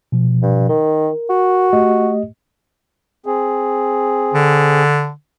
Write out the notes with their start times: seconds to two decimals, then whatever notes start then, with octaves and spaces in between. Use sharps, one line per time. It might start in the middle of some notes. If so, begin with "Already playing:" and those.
0.12 B2 F3
0.42 G2
0.69 D#3 A#4
1.30 F#4
1.73 A3 G4 D#5
3.26 C4 G#4
4.34 D3